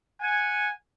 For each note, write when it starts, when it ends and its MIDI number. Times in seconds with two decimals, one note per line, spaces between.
0.20 0.70 78
0.20 0.70 80